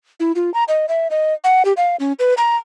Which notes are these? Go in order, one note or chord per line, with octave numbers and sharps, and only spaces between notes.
E4
F4
A#5
D#5
E5
D#5
F#5
G4
F5
C#4
B4
A#5